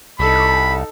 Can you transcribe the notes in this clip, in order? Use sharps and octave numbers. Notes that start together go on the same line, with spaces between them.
C2 D#4 A4 B5